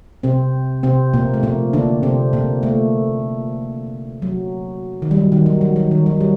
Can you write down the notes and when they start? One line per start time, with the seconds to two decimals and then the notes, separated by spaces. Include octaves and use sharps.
0.23 C3 C4
0.83 C3 C4
1.14 A#2 A#3
1.34 A3
1.43 A#2 A#3
1.73 D3 D4
2.03 C3 C4
2.33 A#2 A#3
2.63 A3
4.22 F#3
5.02 D#3
5.11 G3
5.17 F#3
5.32 D#3
5.46 F#3
5.61 F#3
5.76 F#3
5.91 D#3
6.06 F#3
6.21 G3